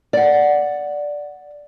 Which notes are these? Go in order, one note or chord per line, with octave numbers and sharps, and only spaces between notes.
D5 F#5